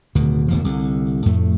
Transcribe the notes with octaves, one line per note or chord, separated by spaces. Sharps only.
D1 D2 B2 D#3
E1 D#2 F3
C2 D3
F2 A2 A3